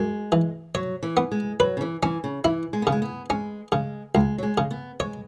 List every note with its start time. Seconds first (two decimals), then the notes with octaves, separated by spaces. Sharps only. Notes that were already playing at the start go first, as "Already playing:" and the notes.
Already playing: F#2 G#3
0.32 E3
0.75 F#3 C#5
1.03 E3
1.17 B3
1.32 G#3
1.60 F#3 B4
1.77 C#3
1.81 E3
2.02 E3 C#4
2.24 C#3
2.44 E3 E4
2.73 G#3
2.82 B3
2.87 C#3
2.92 G#3
3.02 B3
3.30 G#3 C#4
3.72 C#3 G#3
4.15 C#2 G#3
4.38 F#3
4.43 G#3
4.58 C#3
4.71 B3
5.00 G#3 C#5